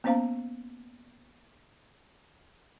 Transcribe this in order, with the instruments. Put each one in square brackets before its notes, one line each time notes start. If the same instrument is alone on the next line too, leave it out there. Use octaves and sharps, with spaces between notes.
[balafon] A#3 B3 C#4 C5 F5 A#5